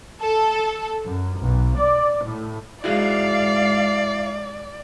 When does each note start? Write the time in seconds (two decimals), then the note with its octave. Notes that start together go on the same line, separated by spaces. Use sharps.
0.21 A4
1.06 F#2
1.40 B1
1.77 D5
2.26 A2
2.84 G#2 E4 F#4 G#4 D5 F5